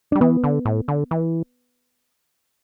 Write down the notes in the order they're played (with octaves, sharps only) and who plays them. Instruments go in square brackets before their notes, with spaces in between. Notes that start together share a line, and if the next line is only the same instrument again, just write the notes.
[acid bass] G3 [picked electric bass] D4
[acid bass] E3 [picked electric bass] B3
[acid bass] D3
A2
D3
E3